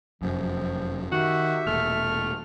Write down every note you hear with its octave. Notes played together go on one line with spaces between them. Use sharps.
F1 F#2 F3
D#3 F#4 G4 E5
E1 A#2 A3 F6